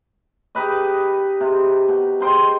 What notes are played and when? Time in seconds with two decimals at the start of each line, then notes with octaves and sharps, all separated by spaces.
0.55 D#4 G4 B4 D#5
1.40 C3
1.88 B2
2.20 D#4 C5 G5 C6